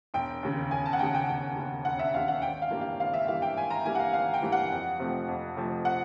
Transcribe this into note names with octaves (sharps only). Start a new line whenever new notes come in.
E1 G5
D#2 C#3
E1 G#5
A5
F#5
D#2 C#3 G5
G5
E1 G5
D#2 C#3
E1 F#5
E5
D#2 C#3 F5
F#5
G#1 G5
F5
G2 E3 G3 A#3
F5
G#1 F5
E5
G2 E3 G3 A#3 F5
G5
G#1 G#5
A#5
G2 E3 G3 A#3 G#5
F#5
F5
G#1 F5
G5
G2 E3 G3 A#3
F#5
F2
C3 F3 A3 C4
F2
C3 F3 A3 C4
F#5